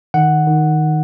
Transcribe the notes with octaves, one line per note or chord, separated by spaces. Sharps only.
D#3 F#5
D#3